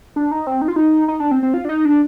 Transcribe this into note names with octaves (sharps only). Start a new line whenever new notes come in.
D4
D#4
C4
D#4
F4
D#4
D#4
D4
C4
C4
F4
D4
D#4
D4